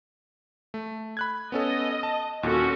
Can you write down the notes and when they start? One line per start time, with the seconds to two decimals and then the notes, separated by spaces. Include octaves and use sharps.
0.74 A3
1.17 B5 F#6 G#6
1.52 B3 C#4 A4 D#5
2.03 A5
2.43 D#2 A#2 C#4 F#4 A4